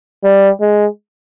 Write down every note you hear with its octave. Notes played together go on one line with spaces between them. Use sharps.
G3
G#3